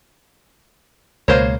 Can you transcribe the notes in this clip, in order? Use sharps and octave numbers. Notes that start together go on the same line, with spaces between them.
C#2 B2 A#3 C5 C#5